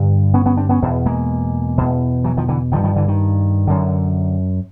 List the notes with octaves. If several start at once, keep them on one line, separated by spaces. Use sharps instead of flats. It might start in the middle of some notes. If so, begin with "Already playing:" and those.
Already playing: G2 D3
B3 C#4
B3 C#4
C4 D4
B3 C#4
E2 B2
G#3 A#3
E2 B2
E3 F#3
D#3 F3
D3 E3
G2 D3 D#3 F3
D#3 F3
D3 E3
D#3
F#2 D3